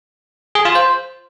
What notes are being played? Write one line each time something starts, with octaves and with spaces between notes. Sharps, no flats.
G#4
F4
C5